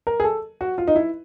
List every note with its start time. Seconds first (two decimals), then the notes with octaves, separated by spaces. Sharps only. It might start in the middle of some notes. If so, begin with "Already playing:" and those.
0.07 A#4
0.20 G#4
0.24 A4
0.61 F#4
0.78 F4
0.88 D#4
0.96 E4